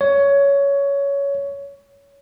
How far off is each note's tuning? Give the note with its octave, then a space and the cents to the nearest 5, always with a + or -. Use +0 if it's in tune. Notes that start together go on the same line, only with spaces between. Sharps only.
C#5 +15